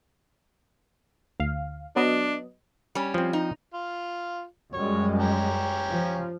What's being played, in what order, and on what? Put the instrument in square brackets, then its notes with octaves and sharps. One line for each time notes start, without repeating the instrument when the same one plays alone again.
[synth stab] D2 F5
[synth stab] F#3 B3 D#5 [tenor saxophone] D4
[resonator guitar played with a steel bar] G3 C#4
[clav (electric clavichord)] F3 C4
[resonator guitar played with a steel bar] D#4
[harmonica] F4
[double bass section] F#2 G3 G#3 [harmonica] C#5
[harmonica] C#4 G4 A#5
[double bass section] F3